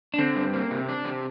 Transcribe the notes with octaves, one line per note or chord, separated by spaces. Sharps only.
D4
D3 C4
G2
A#3
C3
D4
C3